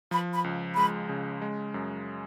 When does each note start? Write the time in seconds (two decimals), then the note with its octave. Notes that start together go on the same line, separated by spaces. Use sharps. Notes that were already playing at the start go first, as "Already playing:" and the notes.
0.11 F3 B5
0.33 B5
0.44 C#2
0.76 G#3 B5
1.09 C#3
1.42 G#3
1.74 F#2